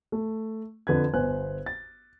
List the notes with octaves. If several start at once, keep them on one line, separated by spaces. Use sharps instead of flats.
A3
F2 D3 B4 G#6
G1 B3 B4 C5 G#5 F#6
A6